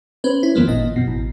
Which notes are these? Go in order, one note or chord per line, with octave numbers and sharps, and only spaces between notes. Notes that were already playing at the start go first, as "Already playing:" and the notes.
C#4 B4 C5
E4
F2 D#3 F3 G#3 A#3 B3
G#1 A#2 D#5
F#2 B2
A1